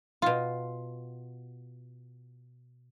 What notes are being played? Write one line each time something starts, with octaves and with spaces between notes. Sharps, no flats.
B2 F4